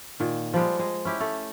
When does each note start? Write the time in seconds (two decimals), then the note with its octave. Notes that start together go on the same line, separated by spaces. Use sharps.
0.20 A#2 D#3
0.54 F3 G3 G#3
0.79 G#3
1.05 C#4 E4 G4
1.20 A3 A4